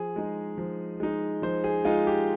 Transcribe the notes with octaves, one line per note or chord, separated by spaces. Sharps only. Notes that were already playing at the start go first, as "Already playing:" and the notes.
Already playing: F3 G#4
G#3 D#4
F3
G#3 D#4
F3 C5
G#4
G#3 D#4 F4
G4